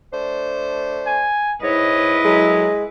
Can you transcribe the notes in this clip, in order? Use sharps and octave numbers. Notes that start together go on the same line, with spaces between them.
A3 D4 C5
G#5
G#2 E4 B4 C#5 D#5
F#2 A2 F#3 G#3